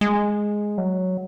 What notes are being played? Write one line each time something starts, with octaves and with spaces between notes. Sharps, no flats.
G#3
F#3